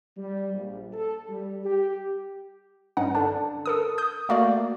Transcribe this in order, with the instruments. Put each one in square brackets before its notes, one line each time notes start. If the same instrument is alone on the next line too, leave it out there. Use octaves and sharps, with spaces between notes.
[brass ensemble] G3
A#1
A4
G3
G4
[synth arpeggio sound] G2 C#4 D#4 F#5
D3 D4
A4 A#4 D#6
D#6 G6
A3 A#3 F#4 D5